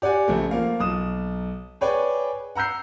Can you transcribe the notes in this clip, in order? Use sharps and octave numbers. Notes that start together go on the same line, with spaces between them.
G4 D5 F#5 G#5
A#1 C#3 A3
F3 A#3 F5
B1 D#6 E7
G#4 B4 C#5 D5 G5 G#5
F#5 A#5 E6 G6 C7